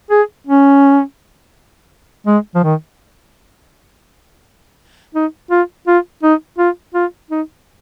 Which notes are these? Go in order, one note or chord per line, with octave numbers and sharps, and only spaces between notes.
G#4
C#4
G#3
F3
D#3
D#4
F4
F4
D#4
F4
F4
D#4